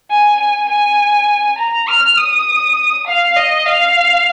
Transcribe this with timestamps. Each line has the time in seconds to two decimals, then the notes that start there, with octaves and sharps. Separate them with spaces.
0.11 G#5
0.40 G#5
0.69 G#5
1.58 A#5
1.88 F6
2.17 D#6
3.07 F5
3.36 D#5
3.66 F5